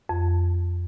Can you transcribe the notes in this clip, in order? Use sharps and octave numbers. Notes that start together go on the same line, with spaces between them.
F2